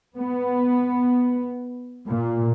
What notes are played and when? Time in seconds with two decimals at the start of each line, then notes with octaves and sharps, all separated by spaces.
0.17 B3
2.06 A#2